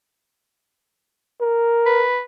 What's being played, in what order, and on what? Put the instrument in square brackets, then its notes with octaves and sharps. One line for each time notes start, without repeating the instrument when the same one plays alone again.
[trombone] A#4
[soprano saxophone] B4